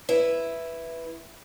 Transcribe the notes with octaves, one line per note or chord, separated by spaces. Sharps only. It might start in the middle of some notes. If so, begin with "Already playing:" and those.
E4 B4